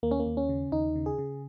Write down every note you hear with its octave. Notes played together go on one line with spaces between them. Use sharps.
D#2 A#3
C#4
A#3
D#2
C#4
C#3
D#2 D#4
C#3
G#4
C#3